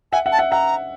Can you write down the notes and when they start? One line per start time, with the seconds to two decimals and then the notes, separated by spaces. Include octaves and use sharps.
0.12 E5 F#5 G#5
0.26 E5 F#5
0.32 A5
0.39 E5 F#5
0.51 E5 F#5 A#5